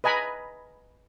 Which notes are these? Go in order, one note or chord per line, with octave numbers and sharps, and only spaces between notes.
B4 D#5 G#5 A#5 B5